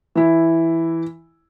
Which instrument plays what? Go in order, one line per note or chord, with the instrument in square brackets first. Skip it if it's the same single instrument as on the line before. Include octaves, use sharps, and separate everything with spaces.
[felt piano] E3 E4